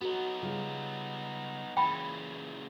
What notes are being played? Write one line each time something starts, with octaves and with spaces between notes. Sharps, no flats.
B3 D#4 F#4 A4 C#5
C#3 G3 F4
A#2 C#3 E3 G5 B5